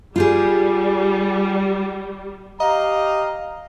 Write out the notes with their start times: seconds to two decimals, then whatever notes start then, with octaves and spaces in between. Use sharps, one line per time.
0.16 G3 F4 G4 G#4
2.60 G4 D#5 F5 A#5